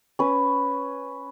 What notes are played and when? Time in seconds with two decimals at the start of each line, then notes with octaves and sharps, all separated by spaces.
0.19 C#4 B4